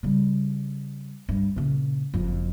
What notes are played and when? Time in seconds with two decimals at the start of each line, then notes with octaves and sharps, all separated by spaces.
0.03 C#3 G3
1.29 G2
1.56 A#2 C#3
2.14 F#1 F2